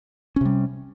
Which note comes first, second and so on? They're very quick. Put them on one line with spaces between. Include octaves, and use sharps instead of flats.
C#4 C3 G3